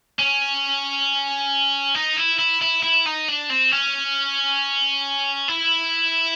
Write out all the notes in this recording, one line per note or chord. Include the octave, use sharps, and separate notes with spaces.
C#4
D#4
E4
E4
E4
E4
D#4
D4
C4
C#4
E4